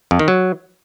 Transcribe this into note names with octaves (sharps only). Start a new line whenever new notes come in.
F2
D#3
F#3